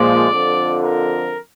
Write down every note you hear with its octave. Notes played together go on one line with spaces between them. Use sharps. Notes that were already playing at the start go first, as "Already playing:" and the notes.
Already playing: A#2 F3 G#3 D5
F2 D3 F3
A#4